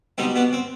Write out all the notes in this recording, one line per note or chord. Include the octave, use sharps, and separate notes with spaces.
B2 G3 C4 D#4
B3 D4
C4